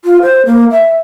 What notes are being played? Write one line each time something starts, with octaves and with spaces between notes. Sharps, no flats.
F4
C5
A#3
E5